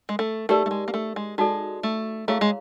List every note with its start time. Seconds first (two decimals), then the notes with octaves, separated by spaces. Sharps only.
0.09 G#3
0.19 A3
0.49 A3 D#4 G4 A#4 D5
0.66 A3
0.71 G#3
0.88 A#3
0.94 A3
1.16 G#3
1.38 G#3 D#4 F#4 A4 D5
1.83 A3
2.28 A3 E4 G#4 C#5 F5
2.41 G#3